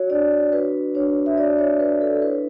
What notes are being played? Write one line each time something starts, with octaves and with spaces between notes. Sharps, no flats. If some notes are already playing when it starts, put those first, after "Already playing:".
Already playing: F#4 C#5
D4 D5
F#4 B4
D4 C#5
E5
F#4 D5
C#5
D4 B4
A4
E4 B4